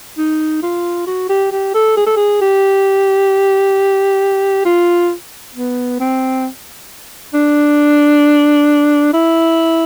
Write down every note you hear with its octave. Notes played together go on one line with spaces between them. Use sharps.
D#4
F4
F#4
G4
G4
A4
G#4
A4
G#4
G4
F4
B3
C4
D4
E4